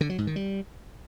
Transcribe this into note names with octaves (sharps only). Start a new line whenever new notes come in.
D3
F#3
G#2
D#3
G3